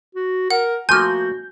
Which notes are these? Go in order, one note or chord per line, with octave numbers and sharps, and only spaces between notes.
F#4
A#4 F#5
F3 A3 A#3 F#4 G#5 F6 G6